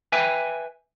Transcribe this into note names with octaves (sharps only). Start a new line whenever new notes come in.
B4 E5 G5 G#5